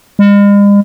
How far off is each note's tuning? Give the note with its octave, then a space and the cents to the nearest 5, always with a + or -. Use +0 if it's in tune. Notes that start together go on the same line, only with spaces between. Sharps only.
G#3 -45